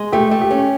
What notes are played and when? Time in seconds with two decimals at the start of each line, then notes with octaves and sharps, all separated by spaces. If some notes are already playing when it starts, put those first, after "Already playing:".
Already playing: G#3
0.12 A3 G4
0.31 A3
0.41 G4
0.51 C#4